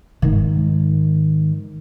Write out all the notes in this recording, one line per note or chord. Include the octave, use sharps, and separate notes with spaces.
G#2 D#3